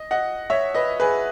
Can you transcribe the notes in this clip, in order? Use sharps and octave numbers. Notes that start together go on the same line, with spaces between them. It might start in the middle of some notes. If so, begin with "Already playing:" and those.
Already playing: D#5
D#5 F#5
C#5 E5
B4 D#5
G#4 B4